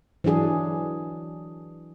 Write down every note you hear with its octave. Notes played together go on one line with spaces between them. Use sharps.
E3 F#3 D4 G#4